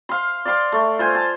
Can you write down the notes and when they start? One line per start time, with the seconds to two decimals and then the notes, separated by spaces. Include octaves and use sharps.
0.09 F5 C6
0.45 D5 F5 C6
0.72 A3
0.99 F4 C5 G#5
1.15 A5